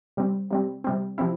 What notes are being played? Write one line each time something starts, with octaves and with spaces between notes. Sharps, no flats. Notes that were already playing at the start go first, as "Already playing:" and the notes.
C3 G3 C4
C3 G3 C4
C3 G3 C4
C3 F3 C4 E4